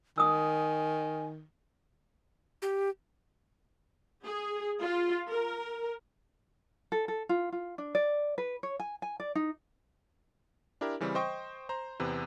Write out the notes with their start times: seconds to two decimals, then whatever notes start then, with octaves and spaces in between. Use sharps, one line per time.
0.18 D#3 G#5 D#6 E6
2.62 G4
4.24 G#4
4.82 F4
5.30 A#4
6.92 A4
7.08 A4
7.29 F4
7.52 F4
7.78 D4
7.95 D5
8.38 B4
8.63 C#5
8.80 G#5
9.02 G#5
9.20 D5
9.35 D#4
10.81 D4 E4 G4 A#4
11.00 C#3 E3 G3 C4 C#4
11.15 C5 D#5 G5 C#6
11.69 C5 A#5
12.00 E2 C3 B4